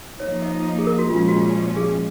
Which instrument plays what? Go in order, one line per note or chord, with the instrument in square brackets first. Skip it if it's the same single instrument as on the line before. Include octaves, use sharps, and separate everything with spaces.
[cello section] F3 A#3 D#4 [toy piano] C#5
[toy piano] D#5
G#4
A#4
F#4
[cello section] A#2 F3 G#3 C#4 [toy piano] F4
[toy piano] F#4
F4
G#4